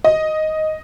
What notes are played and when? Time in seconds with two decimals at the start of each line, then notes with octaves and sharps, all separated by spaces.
0.04 D#5